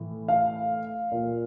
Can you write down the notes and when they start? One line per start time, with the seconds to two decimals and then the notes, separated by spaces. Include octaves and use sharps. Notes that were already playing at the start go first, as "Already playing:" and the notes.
Already playing: A2 E3
0.28 F5
1.11 A#2